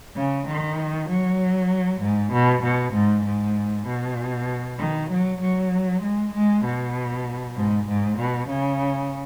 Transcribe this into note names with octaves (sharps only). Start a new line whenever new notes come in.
C#3
D#3
F#3
G#2
B2
B2
G#2
G#2
B2
D#3
F#3
F#3
G#3
G#3
B2
G#2
G#2
B2
C#3